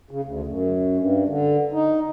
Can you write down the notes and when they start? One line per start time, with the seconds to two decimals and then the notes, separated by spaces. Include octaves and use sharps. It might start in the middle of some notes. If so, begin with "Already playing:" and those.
0.11 C#3
0.24 D2
0.47 F#2
0.97 G2
1.28 D3
1.72 D#4